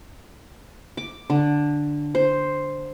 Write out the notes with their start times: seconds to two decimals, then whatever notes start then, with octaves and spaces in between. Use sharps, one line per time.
0.97 D6
1.30 D3
2.15 C5